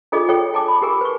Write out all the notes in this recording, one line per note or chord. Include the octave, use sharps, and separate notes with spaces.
D4 F4 G#4 A4 D5 D#5
A4 C#5 G5
G#5 A5 D6
B5
G4 G#4 A#4 G#5
B4 C#6